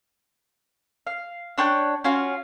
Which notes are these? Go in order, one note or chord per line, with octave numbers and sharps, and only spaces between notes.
F5
D4 C#5 G5 F#6
C#4 F4 F#4